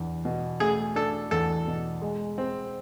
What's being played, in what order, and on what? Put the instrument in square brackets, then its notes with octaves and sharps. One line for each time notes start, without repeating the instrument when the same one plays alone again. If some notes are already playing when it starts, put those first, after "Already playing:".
Already playing: [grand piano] E2 D4
B2
[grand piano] A3 [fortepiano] G#4
[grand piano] D4 [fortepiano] A4
[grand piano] E2 [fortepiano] A4
[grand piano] B2
G#3
C4